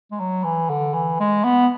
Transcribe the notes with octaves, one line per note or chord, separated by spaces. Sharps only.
G#3
F#3
E3
D3
E3
G#3
B3